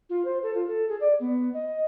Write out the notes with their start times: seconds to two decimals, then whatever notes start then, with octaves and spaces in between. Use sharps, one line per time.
0.10 F4
0.25 C5
0.43 A4
0.54 F4
0.67 A4
0.89 G#4
1.00 D5
1.20 B3
1.54 D#5